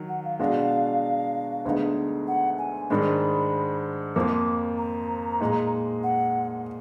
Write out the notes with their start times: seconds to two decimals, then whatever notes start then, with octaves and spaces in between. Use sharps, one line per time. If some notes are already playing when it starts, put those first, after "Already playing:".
Already playing: D#3 F#3
0.09 F#5
0.25 F5
0.39 B2 G#3 D4 F#4 F5
1.65 D2 D3 G#3 B3 D#4
2.27 F#5
2.58 G#5
2.90 G#2 D#3 G#3 D4 B5
4.15 F2 F3 A#3 D6
4.78 A#5
5.41 A#2 G#3 D#4
6.03 F#5